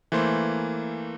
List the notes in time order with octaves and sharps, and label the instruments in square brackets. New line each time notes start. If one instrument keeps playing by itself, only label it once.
[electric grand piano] E3 A3 A#3 C5